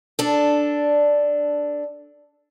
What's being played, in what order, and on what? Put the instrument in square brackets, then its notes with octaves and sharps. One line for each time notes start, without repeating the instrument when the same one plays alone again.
[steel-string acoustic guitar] D4 A4